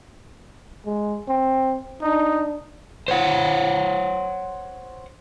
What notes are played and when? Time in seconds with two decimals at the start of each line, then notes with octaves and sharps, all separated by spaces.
0.85 G#3
1.28 C4
2.02 D4 D#4
3.08 C5 C#5 F#5